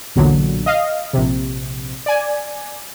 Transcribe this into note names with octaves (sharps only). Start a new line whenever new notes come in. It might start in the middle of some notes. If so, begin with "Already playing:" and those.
B1 E2 A#2 D3 F#3
D#5 F5
A#1 C3
D5 G#5